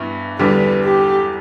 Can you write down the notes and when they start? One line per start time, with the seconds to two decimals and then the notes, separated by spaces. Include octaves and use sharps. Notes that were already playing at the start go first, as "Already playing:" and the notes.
Already playing: G2 E3 B3
0.39 E2 D3 G3 D4 B4
0.85 G4